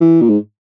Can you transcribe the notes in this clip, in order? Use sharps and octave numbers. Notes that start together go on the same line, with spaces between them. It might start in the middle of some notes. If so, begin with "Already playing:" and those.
E3
A#2
G#2